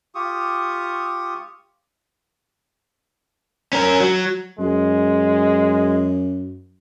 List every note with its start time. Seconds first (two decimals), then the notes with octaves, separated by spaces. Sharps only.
0.15 F4 G4 C#6 D#6
3.73 C#4 A#4
4.00 F#3
4.59 F#2 G#3